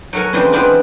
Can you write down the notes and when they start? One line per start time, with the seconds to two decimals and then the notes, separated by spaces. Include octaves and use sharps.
0.13 F#3 F#4 A4 A#4 G#5
0.33 C#3 E3 F3 G#3 C4 D4
0.52 E3 G#3 B3 C4 D4 F4